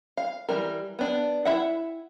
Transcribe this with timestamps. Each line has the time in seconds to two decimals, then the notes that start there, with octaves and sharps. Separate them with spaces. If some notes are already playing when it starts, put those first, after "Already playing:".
0.17 F5
0.49 E3 G3 A#4
0.99 B3 D4
1.45 E4 E5 F#5